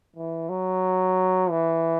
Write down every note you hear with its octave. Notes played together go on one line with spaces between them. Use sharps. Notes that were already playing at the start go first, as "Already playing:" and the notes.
E3
F#3
E3